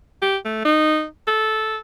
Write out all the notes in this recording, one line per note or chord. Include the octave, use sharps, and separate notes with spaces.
G4
A3
D#4
A4